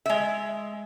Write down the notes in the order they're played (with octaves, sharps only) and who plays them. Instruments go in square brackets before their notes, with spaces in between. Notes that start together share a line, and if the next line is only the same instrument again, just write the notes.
[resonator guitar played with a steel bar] G#3 E5